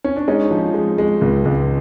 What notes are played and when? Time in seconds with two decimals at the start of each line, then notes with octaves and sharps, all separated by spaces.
0.04 C#4
0.16 D4
0.28 G#3 C#4 D#4
0.51 F3
0.74 G#3
0.98 G#3
1.21 C#2
1.45 C#2